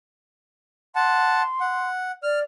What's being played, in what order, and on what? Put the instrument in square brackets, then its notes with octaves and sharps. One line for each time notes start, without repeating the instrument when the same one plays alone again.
[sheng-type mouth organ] F#5 A5 [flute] C6
[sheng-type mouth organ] F#5
[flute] D5 [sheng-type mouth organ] F6